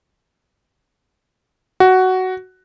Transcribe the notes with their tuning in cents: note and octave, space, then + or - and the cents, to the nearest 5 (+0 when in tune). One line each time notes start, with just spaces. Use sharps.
F#4 +10